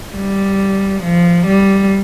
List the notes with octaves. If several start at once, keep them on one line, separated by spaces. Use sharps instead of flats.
G3
F3
G3